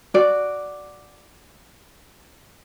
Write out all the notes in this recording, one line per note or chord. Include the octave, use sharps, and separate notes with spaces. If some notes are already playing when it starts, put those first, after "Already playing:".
F#4 D5